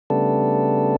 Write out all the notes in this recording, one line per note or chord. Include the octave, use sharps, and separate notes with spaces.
C#3 G3 A3 B3 D4 A4